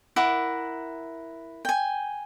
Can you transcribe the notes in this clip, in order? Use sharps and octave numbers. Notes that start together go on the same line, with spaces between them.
E4 A#4 F#5 D6
G5 G#5